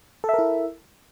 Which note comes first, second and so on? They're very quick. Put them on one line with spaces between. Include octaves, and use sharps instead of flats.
A4 E5 A#4 E4